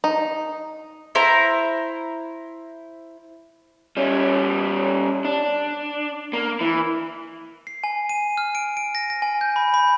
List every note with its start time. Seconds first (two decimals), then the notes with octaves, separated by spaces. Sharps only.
0.04 D#4
1.15 E4 C5 A#5
3.97 G3 C#4
5.25 D4
6.33 A#3
6.61 E3
7.67 C7
7.84 G#5
8.09 D#7
8.38 F6
8.55 D7
8.77 D7
8.95 A#6
9.10 A#6
9.22 G#5
9.41 G6
9.56 B5
9.74 B5